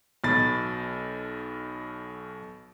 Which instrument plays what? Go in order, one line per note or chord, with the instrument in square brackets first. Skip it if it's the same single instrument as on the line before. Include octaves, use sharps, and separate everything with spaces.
[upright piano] B1 B2 B5 A6